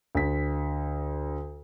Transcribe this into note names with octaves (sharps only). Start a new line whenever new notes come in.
D2 B6